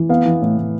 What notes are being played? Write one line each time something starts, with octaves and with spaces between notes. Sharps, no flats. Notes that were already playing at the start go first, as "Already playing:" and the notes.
Already playing: E3
B3 F5
E3
A2
A2